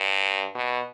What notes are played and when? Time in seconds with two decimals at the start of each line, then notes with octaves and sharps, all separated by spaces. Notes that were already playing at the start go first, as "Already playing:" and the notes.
Already playing: G2
0.55 B2